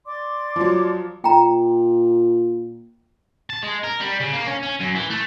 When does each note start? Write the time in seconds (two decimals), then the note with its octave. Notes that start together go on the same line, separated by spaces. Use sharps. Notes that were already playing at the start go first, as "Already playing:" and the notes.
0.06 D5 C6 D6
0.56 F3 F#3
1.24 A#2 G5 A#5
3.50 A5
3.63 G#3
3.84 A#4
4.00 G3
4.20 C#3
4.33 A#3
4.47 C#4
4.62 C#4
4.80 F#2
4.95 E3
5.10 A3